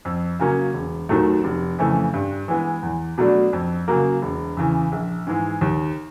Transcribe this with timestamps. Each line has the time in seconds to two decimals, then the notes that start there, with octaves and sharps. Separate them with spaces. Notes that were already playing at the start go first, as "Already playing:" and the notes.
0.05 F2
0.39 C#3 F#3 A#3 C#4
0.74 E1
1.09 D#2 D#3 F#3 A3
1.44 F1
1.79 F2 C#3 E3 A3
2.14 G2
2.48 E3 G#3 B3
2.83 E2
3.18 B2 F#3 A3 D4
3.53 F2
3.88 C#3 F#3 A#3
4.22 E1
4.57 E2 C#3 E3
4.92 A#1
5.27 G#2 E3 G#3
5.61 D#2